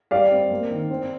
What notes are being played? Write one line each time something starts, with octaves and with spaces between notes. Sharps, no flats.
G3 D5 F5
C4
A#3
D#3
C4